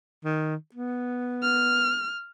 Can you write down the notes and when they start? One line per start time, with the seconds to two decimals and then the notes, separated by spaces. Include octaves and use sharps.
0.25 D#3
0.74 B3
1.43 F6